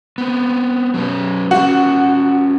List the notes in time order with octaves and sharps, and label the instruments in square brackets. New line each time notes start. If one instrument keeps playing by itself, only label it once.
[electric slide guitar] B3 C4
F#3 C#4 B4
[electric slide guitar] G3 C#4 [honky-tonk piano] F#4